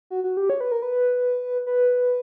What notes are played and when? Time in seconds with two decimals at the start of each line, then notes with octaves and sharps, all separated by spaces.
0.10 F#4
0.24 F#4
0.37 G4
0.50 C#5
0.61 B4
0.72 A#4
0.82 B4
1.66 B4